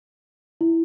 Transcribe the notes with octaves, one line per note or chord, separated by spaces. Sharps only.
E4